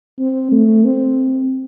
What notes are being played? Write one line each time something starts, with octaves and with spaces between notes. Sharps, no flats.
C4
A3
C4